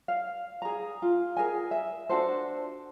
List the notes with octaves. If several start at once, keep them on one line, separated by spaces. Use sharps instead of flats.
F5
G#4 A#5
F4
G#4 A#4 G#5
E5
D4 F#4 A4 C5